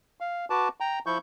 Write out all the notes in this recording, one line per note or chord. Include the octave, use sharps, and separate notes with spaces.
F5
F#4 B4 A5 D6
G5 A#5
F3 E4 C#6 G6